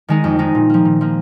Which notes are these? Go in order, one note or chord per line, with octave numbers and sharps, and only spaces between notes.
D#3 G#3 D#4
F2
D#3 G#3 D#4
A#2
F3 A#3
A#2
F3 A#3